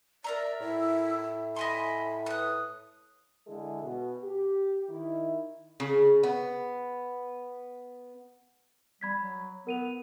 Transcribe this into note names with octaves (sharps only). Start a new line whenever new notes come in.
A#4 D5 E5 A#5
A2 E4
D#5 G#5 B5 C6
B4 D#6 F#6
D3 G#3 E4 G#4 A4
B2
G4
D#3 E4
C#3
B3
G3 B5 G#6 B6
F#3
B3 A#4 D#7 F7